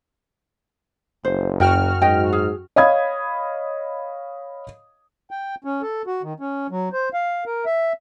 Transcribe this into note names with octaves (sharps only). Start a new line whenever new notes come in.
F#1 C5
F#2 F#4 A#4 G5 F6
G#2 D#5 G5
G#4
C#5 D#5 F5 B5 D#6 G#6
G5
C#4
A4
F#4
D#3
C#4
F#3
C5
F5
A#4
E5